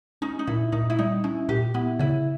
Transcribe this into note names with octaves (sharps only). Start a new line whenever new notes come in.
C#4 D#4
D#4
A#2 E4
A#2 D#4
E4
G3 D#4
C#4 E4
A#2 G4
B3 E4
C#3 E4